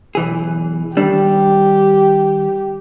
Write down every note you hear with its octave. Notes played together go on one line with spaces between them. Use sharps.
B1 E3 G#4
D#3 G3 D4 G4